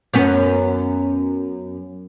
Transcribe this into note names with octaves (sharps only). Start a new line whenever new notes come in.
F#2 B3 C#4